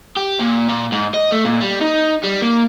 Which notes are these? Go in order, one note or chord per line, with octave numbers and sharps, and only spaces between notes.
G4
A#2
A#2
G#2
D#5
A3
A#2
G3
D#4
G3
A#3